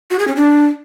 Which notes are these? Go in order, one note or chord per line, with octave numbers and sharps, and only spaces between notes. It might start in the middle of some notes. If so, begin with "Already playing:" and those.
F#4
G#4
C#4
D4